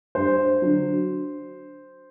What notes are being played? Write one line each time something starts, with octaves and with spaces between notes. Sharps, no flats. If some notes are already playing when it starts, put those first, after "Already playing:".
G2 C5
D3 F#3